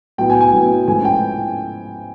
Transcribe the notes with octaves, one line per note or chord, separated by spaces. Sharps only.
A2 F#3 B3 E4 G5
G#5
G#5
A2 F#3 B3 E4
G#2 F3 A3 C#4 E4 G#5
G5